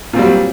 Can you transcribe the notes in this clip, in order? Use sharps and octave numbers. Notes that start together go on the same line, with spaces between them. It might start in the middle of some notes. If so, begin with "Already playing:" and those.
A#2 F#3 G3 C4